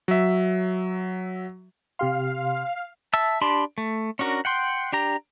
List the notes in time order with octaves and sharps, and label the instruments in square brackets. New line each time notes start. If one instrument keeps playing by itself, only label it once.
[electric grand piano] F#3 E5
[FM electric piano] C3 G4 C6 [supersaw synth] F5
[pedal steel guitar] E5 A5 E6
D4 G4 A5 B5 C6
A3
C#4 D4 F#4 A#4
F#5 G5 C6
D4 G4 A#5